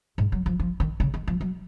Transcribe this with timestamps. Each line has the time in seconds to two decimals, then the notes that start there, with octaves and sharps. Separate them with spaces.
0.18 G#2
0.32 F#3
0.46 F3
0.60 F3
0.80 D#3
1.00 C#3
1.14 D#3
1.28 F3
1.41 F#3